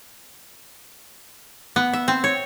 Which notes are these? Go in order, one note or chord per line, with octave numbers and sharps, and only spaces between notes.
B3
E5
C4
C#5